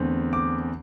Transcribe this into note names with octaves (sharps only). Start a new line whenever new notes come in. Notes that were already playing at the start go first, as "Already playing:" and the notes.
Already playing: E2 D3 A3 C4
D6